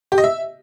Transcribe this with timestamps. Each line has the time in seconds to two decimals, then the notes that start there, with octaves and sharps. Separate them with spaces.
0.12 G4
0.18 D#5
0.24 E5